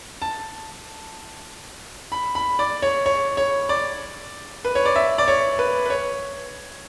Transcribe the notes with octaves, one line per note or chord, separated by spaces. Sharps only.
A5
B5
B5
D5
C#5
C#5
C#5
D5
B4
C#5
D5
E5
D5
C#5
B4
B4
C#5